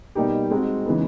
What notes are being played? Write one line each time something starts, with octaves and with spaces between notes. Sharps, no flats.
B2 G3 A#3 D#4 G4
G#3 C4 D#4 F#4
C#3 E3 G#3 B3 D#4